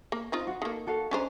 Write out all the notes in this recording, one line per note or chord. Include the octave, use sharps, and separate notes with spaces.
A#3
C4 D#4 F4
F#4 C5
D#3 A#3 A4
F#4 A4 F5
C#4 D4 C5 D#5 G#5 A#5